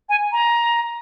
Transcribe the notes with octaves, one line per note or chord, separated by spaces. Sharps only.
G#5
A#5